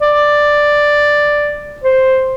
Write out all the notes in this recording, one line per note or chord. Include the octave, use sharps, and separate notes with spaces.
D5
C5